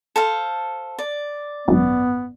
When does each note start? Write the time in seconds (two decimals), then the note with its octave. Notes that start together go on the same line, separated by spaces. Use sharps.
0.16 A4 C5 F5
0.98 D5
1.68 G#1 F#2 B3